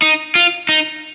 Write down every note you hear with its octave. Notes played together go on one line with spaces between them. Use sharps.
D#4
F4
D#4